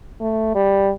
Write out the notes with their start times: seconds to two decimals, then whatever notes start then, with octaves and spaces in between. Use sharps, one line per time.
0.21 A3
0.55 G3